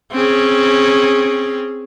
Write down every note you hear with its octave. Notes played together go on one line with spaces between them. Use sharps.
C4 C#4 G#4